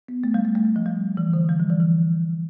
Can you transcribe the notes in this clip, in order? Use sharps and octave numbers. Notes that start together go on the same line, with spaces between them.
B3
A3
G3
A3
A3
G3
F3
G3
E3
D3
G3
F3
E3
E3